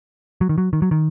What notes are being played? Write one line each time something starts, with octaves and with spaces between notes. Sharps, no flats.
F#3
D#3
F#3
D#3
F#3
D#3